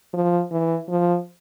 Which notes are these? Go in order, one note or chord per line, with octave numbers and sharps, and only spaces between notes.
F3
E3
F3